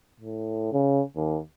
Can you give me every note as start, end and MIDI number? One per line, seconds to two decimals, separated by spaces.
0.21 0.68 45
0.72 1.02 49
1.16 1.40 39